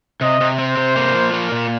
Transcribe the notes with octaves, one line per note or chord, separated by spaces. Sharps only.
C3 D#5
C3
C4 C5
C3
A#3
F3
A#3
A#2